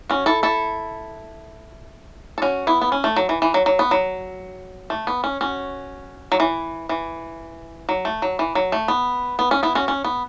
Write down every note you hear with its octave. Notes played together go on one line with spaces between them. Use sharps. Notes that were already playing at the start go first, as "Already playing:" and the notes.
C#4 F#4
E4 A4
E4 A4
A4
C#4 F#4
B3 E4
B3
C#4
A3
F#3
E3
E3
F#3
F#3
B3
F#3
A3
B3
C#4
C#4 F#4
F#3
E3
E3
F#3
A3
F#3
E3
F#3
A3
B3
B3
C#4
B3 E4
C#4 F#4
C#4
B3